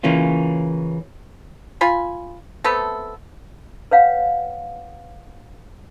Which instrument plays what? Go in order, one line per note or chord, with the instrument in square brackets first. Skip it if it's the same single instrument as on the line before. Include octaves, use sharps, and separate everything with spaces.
[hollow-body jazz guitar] C#3 E3 A#3 C#4 F4
[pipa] F4 G#5 B5
A3 B3 C4 A4
[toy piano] B4 C#5 F5 F#5